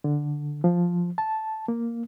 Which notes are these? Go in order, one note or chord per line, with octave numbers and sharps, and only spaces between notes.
D3
F3
A5
A#3